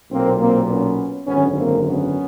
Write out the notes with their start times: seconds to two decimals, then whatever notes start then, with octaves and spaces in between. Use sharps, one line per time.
0.11 B1 A#2 A#3 C4
0.40 A#3 C4
0.69 B3 C#4
1.27 G#1 F#2 D3 B3 C#4
1.57 A#3 C4
1.85 B3 C#4